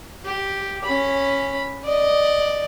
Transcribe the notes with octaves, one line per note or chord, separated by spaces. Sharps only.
G4
C#4 B5
D5 D#5